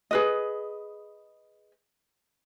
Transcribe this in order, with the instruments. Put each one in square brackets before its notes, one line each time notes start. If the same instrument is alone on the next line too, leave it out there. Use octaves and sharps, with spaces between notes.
[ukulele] G#4 B4 D#5